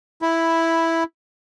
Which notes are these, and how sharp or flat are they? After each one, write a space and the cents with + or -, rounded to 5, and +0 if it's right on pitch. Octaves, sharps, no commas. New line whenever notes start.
E4 +0 B5 -5